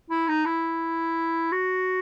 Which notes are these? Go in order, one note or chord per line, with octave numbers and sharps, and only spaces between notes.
E4
D#4
E4
F#4